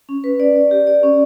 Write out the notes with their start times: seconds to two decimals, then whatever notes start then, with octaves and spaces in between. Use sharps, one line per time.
0.09 C#4
0.24 B4
0.40 D5
0.56 D5
0.71 G4
0.87 D5
1.03 C#4